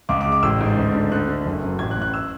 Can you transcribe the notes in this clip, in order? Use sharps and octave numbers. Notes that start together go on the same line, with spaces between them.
C#2 D6
D6
C#3
D6
A1 E6
G#2
D2
D3
D2 F#6
D3
F#1
F#2
A1 G#6
F#6
A2
F#6
E6